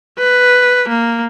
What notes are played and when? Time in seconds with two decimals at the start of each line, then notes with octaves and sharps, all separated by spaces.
0.19 B4
0.88 A#3